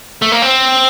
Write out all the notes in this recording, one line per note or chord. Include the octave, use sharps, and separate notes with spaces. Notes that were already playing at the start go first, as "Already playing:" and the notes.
A3
A#3
C4